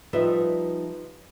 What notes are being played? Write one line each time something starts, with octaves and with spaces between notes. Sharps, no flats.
F3 G3 D#4 B4 E5